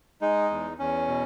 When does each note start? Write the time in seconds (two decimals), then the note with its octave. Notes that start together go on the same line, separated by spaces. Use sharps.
0.21 G#3 D#4
0.50 E2
0.79 E2 C#4
1.08 B2